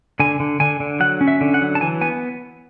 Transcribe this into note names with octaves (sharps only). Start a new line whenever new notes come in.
D3 G#5
D3
D3 G#5
D3
F#3 F#5
C#4
E5
D3
F#5
F#3
A5
E3 G#5
B3 G#5